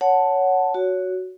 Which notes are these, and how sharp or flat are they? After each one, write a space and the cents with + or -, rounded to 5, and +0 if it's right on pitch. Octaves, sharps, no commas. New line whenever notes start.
C#5 +10 F#5 +0 A5 +0
F#4 +0 C#5 +20